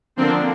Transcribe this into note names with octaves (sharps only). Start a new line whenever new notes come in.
D3 F3 A#3 C4 D4